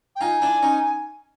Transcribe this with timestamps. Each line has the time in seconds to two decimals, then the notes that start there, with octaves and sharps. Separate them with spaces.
0.16 G5
0.21 D#4 F4 G#5
0.42 D4 E4
0.62 C#4 D#4